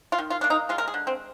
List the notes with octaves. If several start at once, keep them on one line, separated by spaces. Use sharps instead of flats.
F4
D#3
F4
A#3 D4
D#4
G#3 F4
A#4
G#4
D3
C4